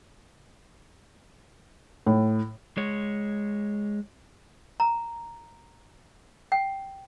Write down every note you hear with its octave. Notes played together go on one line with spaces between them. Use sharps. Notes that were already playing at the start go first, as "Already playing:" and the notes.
A2
G#3 C#5
A#5
G5